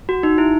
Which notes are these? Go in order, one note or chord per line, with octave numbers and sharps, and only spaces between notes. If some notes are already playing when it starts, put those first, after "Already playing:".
F#4
D#4
E4